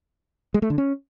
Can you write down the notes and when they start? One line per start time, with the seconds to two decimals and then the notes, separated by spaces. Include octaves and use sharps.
0.54 G#3
0.62 A3
0.70 D3
0.78 C#4